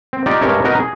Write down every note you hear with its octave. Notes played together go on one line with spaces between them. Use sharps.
C4
D#4 F4 G4 D5
G2 G3 G#3 A#4 C#5 E5
D#4 F#4 A#4 B4 D#5
G#4